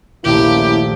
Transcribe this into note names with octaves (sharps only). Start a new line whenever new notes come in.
D#1 A#1 A3 A#3 C#4 E4 G4